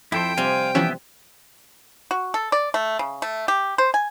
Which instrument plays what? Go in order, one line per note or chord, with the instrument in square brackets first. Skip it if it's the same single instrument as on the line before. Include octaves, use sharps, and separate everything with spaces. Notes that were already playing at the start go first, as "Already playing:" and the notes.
[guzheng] F2 [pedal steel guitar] E4 A4 C5 [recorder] G5
[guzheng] C3 G3 C4 [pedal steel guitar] F5 G#5
[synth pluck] E3 F3 C#4 [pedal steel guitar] B3 G4 E5
[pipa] F#4
A4
D5
A3
C#3
A3
G4
C5
G#5